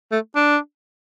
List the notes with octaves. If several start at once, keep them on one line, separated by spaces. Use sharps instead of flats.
A3
D4